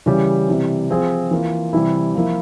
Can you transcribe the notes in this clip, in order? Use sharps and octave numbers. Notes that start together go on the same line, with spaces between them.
C#3 E3 G3 C#4 G4
C3 E3 G3 C4
F3 C4 F4 G#4
E3 A#3 F4
C3 E3 G3 C4 E4
F3 A#3 E4